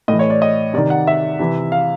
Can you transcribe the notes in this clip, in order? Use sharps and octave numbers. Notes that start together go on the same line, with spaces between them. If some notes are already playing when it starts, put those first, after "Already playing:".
A2 E3 D#5
C#5
D5
D#5
C3 D#3 D5
F#5
E5
C3 E3
F5